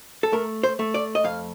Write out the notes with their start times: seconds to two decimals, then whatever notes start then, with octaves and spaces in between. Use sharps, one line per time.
0.23 A4
0.32 A3 A#4
0.63 C5
0.79 A3
0.94 D5
1.15 D#5
1.24 F2 F5